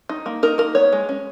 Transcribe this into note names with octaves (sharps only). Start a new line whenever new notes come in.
D#4
A#3
D#4 A#4
A#3 A#4
B3 C#5
G#3
C#4